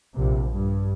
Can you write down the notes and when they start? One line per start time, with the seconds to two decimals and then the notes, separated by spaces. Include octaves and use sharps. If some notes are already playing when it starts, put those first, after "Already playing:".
0.15 A#1 C3
0.50 G2